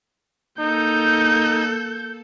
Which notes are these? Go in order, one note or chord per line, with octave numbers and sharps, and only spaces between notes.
A#3 D#4 A4 G6